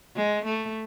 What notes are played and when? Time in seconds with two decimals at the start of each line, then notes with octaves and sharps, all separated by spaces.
0.16 G#3
0.45 A3